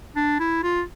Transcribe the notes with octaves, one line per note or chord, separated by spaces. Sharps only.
D4
E4
F4